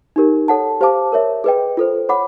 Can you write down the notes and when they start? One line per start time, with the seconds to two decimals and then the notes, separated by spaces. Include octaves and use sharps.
0.16 D#4 G4 A#4
0.48 A4 C#5 F#5 A5
0.81 G4 C5 F5 A5 D6
1.12 A#4 C#5 E5
1.44 G#4 B4 D#5 G5
1.77 F4 A4 C5
2.09 C#5 F#5 B5 D6